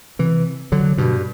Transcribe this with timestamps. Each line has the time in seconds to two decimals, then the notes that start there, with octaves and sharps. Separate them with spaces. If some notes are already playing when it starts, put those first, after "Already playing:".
0.19 C3 E3
0.72 D3 F#3
0.98 G2 B2